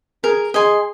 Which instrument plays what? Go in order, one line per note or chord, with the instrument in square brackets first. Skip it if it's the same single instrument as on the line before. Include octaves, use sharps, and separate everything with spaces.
[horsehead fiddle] G#4 [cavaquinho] A#4
[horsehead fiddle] G#4 [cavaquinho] D#5 G#5 C6